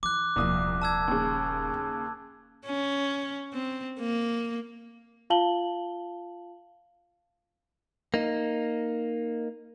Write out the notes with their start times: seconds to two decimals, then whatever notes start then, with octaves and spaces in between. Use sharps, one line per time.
0.03 E3 D6 F#6
0.36 D#1 C2 F3 A#3 D#6
0.82 A5 E6 G#6
1.08 D#2 C#3
1.74 A#3
2.65 C#4
3.54 C4
4.00 A#3
5.30 F4 F5 A5 F#7 G7
8.14 A#3 D#4